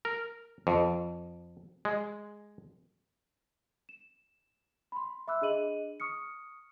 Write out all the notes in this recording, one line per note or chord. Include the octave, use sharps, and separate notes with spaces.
A#4
F2
G#3
E7
B5 C6
E5 B5 D6 E6 F#6
D4 G#4 D#5 D#7 F#7
C#6 D#6 F6 C#7